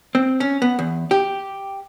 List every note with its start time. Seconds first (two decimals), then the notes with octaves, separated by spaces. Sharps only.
0.15 C4
0.40 C#4
0.62 B3
0.79 E2
1.11 G4